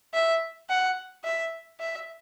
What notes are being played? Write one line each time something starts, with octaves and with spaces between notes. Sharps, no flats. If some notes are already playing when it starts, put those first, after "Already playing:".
E5
F#5
E5
E5